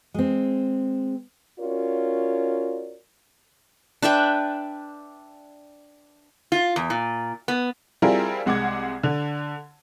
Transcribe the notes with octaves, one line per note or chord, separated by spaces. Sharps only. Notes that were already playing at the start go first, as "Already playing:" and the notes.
G#3 C4
C#4 F4 F#4 A#4 C#5 D5
D4 B4 E5 G5
F4
E2
A#2
B3
G3 C4 E4 F4 G#4 A#4
C2 G#3 F#5 D6 G#6
D3